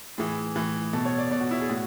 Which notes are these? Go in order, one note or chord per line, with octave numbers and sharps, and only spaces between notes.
A2 E3 G#4
A2 E3
B2 A4
C#5
D5
B2 D5
F#4
E4
G#4
A2 F#4